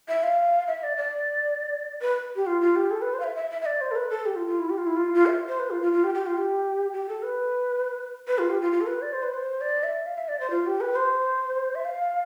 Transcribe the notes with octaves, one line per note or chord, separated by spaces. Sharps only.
E5
F5
E5
D5
D5
B4
G4
F4
F4
G4
A4
B4
C5
F5
E5
E5
E5
E5
D5
C5
A4
B4
A4
G4
F4
F4
E4
G4
F4
E4
F4
F4
E5
C5
B4
F4
F4
F4
G4
G4
F4
G4
G4
A4
B4
B4
F4
G4
F4
F4
A4
B4
D5
C5
B4
C5
D5
E5
F5
E5
D5
C5
F4
G4
B4
C5
E5
F5